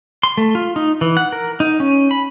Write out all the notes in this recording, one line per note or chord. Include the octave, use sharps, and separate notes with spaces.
C6
A3
F4
D#4
E3
F#5
A#4
D#4
C#4
B5